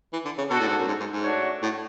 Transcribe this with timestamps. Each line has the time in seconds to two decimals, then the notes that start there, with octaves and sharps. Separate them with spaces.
0.13 E3
0.25 D3
0.38 C#3
0.50 B2 D4 F#4 A4
0.60 A2
0.68 G#2
0.78 F#2
0.87 G#2
1.00 G#2
1.12 G#2
1.24 A3 D4 F#4 C#5
1.62 A2